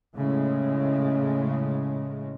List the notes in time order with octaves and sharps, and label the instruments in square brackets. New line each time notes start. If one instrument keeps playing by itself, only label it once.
[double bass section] A2 C#3 G#3